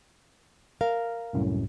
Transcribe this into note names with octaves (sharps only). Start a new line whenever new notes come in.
A#4 F5
C2 F#2 A2